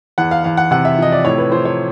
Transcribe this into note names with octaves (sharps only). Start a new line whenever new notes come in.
E2 F#5
F5
E2 F5
F#5
C3 F#5
E5
F3 D#5
D5
A2 C#5
B4
F3 C5
C#5